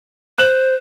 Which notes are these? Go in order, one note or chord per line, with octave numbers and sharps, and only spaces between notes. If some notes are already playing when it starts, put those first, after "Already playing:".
C5 F#6 E7 F#7